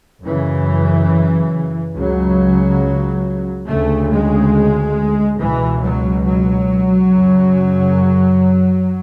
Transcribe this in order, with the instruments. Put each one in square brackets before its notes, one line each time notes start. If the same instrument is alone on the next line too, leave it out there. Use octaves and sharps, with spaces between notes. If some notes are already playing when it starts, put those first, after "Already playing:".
[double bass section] F#2 C#3 E3
C#2 C#3 F#3
D2 C#3 A3
G#3
C#2 B2 E3
F#3
F#3
C#3
F#2